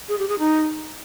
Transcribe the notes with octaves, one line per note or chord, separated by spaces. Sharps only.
G#4
G4
G#4
D#4